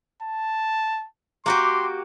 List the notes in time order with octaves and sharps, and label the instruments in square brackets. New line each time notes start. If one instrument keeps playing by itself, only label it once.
[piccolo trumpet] A5
[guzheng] A#3 F#4 G4 [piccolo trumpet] C6